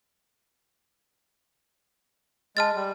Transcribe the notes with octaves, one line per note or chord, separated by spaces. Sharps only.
G#3 A5 F6 A6
G3